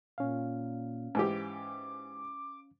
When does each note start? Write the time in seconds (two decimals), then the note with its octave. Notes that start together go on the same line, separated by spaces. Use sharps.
0.18 A#2 C#4 F5
1.15 G#2 E3 G4 D6